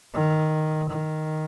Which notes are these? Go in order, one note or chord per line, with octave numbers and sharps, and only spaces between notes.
D#3
D#3